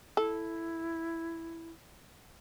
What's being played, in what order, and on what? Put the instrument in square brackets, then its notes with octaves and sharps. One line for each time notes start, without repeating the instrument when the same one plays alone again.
[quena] E4 [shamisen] A4